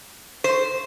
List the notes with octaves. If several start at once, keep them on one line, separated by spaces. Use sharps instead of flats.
C5